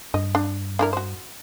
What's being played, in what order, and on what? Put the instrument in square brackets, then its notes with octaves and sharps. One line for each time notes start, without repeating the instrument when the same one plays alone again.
[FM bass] G2 [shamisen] D#5
[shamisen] D4
D4 E4 A#4
F#4 C5